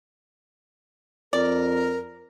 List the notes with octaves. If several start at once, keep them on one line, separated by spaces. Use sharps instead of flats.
F2 A#4 D5